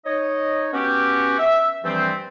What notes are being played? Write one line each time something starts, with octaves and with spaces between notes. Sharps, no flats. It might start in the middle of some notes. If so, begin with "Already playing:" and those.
D#4 C#5 D#5
B3 C#4 F#4 G4
E5
G2 E3 F3 G3 A3 C4